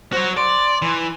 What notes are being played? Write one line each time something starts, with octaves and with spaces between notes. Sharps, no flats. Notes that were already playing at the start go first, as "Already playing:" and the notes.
F#4 C5 C#5
D5 C6
E3